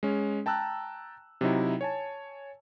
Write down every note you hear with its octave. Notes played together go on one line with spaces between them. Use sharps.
G#3 C#4
G5 A5 A#5 E6 F#6
C3 F#3 D#4 E4
C#5 G#5 A5